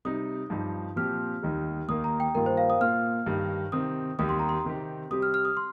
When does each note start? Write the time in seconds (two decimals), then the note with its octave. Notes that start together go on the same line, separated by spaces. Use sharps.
0.05 C3 G3 D#4 D#6
0.50 G2 F3 D#4 G4
0.96 A#2 F3 C4 G4 F6
1.42 D#2 D#3 G3 D#4
1.88 D#2 D#3 A#3 D#6
2.04 A#5
2.20 G5
2.35 G2 D#3 A#3 F4 A#4
2.46 C5
2.57 F5
2.70 D#6
2.81 A#2 A#3 F4 F6
3.26 G2 D#3 G3
3.72 C3 D#3 C4 D#6
4.19 D#2 D#3 G3 D#4 G4 D#6
4.29 C6
4.39 A#5
4.49 C6
4.64 C3 D#3 C4 G4
5.10 C3 G3 C4 G4 D#6
5.22 F6
5.34 F6
5.45 D#6
5.57 C6